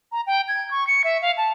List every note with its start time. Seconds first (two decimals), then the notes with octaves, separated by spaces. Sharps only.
0.12 A#5
0.27 G5
0.48 G#6
0.71 C#6
0.87 C#7
1.04 E5
1.22 F5
1.37 A5